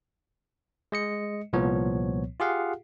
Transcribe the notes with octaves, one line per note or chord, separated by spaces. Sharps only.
G#3 D#5 C#7
C2 A#2 F3 B3 C#5
F4 G4 G#4 F5 F#5